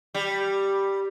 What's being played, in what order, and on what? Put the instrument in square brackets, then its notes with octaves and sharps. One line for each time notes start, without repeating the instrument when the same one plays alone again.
[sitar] G3